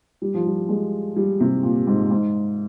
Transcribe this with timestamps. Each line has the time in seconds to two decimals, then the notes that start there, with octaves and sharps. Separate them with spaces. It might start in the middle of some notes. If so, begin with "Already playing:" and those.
0.22 G3
0.34 F3
0.46 G3
0.69 G#3
1.16 G3
1.40 C3
1.63 A#2
1.87 G#2
2.11 G#2